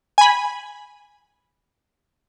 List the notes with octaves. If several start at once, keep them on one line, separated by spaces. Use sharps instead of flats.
G#5 B5